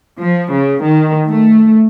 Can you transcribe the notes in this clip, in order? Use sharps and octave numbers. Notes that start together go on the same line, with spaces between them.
F3
C#3
D#3
A3